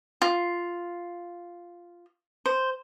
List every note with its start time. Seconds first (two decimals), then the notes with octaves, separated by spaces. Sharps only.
0.22 F4
2.46 C5